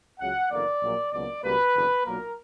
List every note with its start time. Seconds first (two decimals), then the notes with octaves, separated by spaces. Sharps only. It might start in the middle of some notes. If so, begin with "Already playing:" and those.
0.19 C#2 C#3 F#3 F#5
0.51 F#1 E2 D3 A#3 D5
0.82 A#1 A#2 F#3 A#3
1.12 C#2 B2 F#3 A#3 D5
1.43 C#2 B2 G3 A#3 B4
1.74 F#1 E2 D3
2.05 B1 A#2 F#3 A#3 A#4